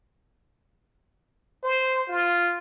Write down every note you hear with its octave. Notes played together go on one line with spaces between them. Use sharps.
C5
F4